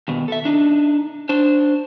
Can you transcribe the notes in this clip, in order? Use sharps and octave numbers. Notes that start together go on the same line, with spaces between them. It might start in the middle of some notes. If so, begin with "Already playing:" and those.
D#2 B2
A4 E5
D4 D#4
D4 C5